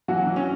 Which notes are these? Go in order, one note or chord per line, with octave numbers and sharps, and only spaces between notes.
E3 F#3 F#4
E3
C#4